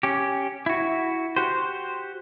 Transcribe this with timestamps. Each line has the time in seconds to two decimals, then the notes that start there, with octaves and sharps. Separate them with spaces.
0.03 C#4 G4
0.66 E4 F#4
1.36 F#4 G4 C5